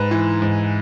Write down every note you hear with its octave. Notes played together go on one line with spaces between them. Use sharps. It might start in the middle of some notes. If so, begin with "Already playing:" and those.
Already playing: G#2 B4
E3
G#2